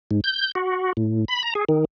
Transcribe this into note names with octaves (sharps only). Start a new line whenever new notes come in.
G#2
G6
F#4
A2
B5
A#5
G#4
D#3